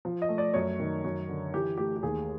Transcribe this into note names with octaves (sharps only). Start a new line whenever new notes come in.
F3
D#5
A3
D5
F#2 C#5
D#3
F#2
D3
E3 G4
A3 G4
G4
D#2 G#4